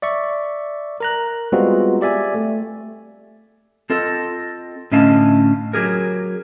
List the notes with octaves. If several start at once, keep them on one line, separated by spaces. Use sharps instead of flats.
D5 E5 C#6
A#4 A#5 F#6
G3 G#3 B3 C4 F4 F#4
G4 D5 E5 G#5
A3
C4 F4 A4 D#5
A2 D3 C#4 D#5 F5 A5
F#3 G4 G#4 A#4